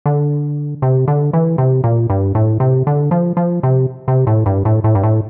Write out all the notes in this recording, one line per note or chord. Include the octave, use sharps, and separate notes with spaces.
D3
C3
D3
E3
C3
A#2
G2
A2
C3
D3
F3
F3
C3
C3
A2
G2
A2
A2
G2
A2